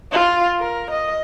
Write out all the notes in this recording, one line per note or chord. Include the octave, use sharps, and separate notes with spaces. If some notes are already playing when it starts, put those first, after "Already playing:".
F4
A#4
D#5